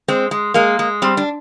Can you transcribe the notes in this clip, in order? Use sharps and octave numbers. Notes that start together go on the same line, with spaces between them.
G#3 C4
G#3
G#3 A#3
G#3
G3 C4
D4